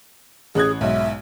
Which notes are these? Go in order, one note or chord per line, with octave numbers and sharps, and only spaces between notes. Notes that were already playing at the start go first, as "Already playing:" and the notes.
A1 G#4 F#6 G#6
B1 G#2 E5